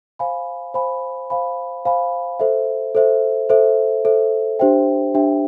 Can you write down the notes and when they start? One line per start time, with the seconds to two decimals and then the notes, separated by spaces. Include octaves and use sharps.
0.19 C5 F5 G#5 B5
0.74 C5 F5 G#5 B5
1.30 C5 F5 G#5 B5
1.85 C5 F5 G#5 B5
2.40 A4 C5 E5
2.95 A4 C5 E5
3.50 A4 C5 E5
4.05 A4 C5 E5
4.59 D4 G4 C5 E5 G5
5.14 D4 G4 C5 E5 G5